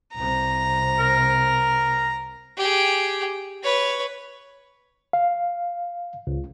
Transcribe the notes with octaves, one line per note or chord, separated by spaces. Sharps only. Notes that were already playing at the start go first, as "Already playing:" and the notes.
C2 C3 A#5
A#4
G4 G#4
B4 C#5
F5
C#2